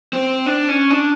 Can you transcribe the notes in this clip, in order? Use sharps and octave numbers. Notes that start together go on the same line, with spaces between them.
C4
D4
C#4
D4